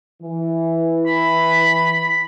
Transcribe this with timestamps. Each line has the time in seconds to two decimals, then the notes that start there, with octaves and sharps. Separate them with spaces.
0.22 E3
1.06 B5